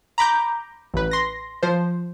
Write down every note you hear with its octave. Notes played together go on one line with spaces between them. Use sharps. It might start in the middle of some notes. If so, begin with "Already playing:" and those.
A#5 B5 D6 G6
A1 B4
C6 A#6
F3 C5